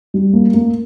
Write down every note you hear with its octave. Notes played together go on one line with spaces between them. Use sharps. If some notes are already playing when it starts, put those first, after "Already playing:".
G3
A#3
A#3